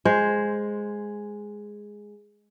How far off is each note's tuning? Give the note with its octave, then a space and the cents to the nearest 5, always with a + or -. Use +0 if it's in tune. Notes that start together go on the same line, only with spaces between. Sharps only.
G#3 +0 C5 +0